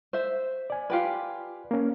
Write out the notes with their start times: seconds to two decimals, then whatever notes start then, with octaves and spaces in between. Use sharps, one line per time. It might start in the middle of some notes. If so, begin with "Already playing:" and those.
0.13 C5 E5
0.70 D5 G#5
0.90 F4 G4 B4
1.71 A#3 C#4